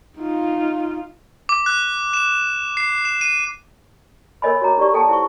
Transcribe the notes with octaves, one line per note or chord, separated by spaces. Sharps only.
D#4 F4
D6
F#6
E7
C7
E7
D#7
A4 A#4 C#5 D#5 G#5 B5
F#4 C#5 A#5 D6
D#4 G4 D5 C#6
A4 G5 A5
E4 C5 C#6